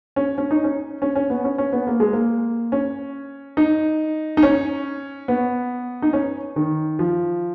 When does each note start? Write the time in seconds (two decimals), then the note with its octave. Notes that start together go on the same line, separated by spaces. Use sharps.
0.16 C#4
0.38 C#4
0.51 D#4
0.64 C#4
1.02 C#4
1.16 C#4
1.30 B3
1.44 C#4
1.58 C#4
1.73 B3
1.87 A#3
2.00 G#3
2.13 A#3
2.72 C#4
3.57 D#4
4.37 D#4
4.43 C#4
5.28 B3
6.02 D#4
6.13 C#4
6.56 D#3
6.99 F3